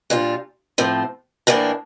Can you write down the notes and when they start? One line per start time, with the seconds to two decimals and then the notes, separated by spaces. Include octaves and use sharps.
0.10 A#2 G3 D4 F4
0.78 A2 F3 C4
1.47 A2 E3 A#3 D4